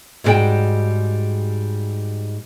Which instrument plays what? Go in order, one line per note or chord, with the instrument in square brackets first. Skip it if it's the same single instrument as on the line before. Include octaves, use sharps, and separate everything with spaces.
[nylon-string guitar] G#2 G3 D#4 F#4 G#4 G5